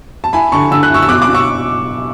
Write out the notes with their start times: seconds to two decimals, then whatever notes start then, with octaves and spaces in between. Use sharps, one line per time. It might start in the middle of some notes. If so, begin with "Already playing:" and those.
0.24 A5
0.33 E4 G#5 B5
0.52 D3 A5 C#6
0.71 D3 E6
0.83 F#6
0.90 E4 C#6 E6
1.02 E6
1.09 B2 D6 F#6
1.22 D6 F#6
1.29 B2
1.34 C#6 E6